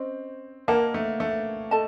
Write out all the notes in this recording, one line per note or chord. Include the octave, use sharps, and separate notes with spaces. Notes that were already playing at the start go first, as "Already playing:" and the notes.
Already playing: C4 C#4 C5 D#5
A#3 A#4 D#5 F#5 A5
A3
A3
A4 D#5 A5